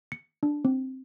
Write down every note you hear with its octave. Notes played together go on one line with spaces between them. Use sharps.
C#7
D4
C4